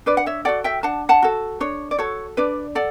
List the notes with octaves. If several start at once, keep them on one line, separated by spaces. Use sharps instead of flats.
D4 B4 D5
F#5
C#5 E5
F#4 A4 D5 F#5
E5 G5
D4 F#5 A5
F#5 A5
F#4 A4
D4 C#5
D5
F#4 A4 C#5
D4 B4 D5
A4 D5 F#5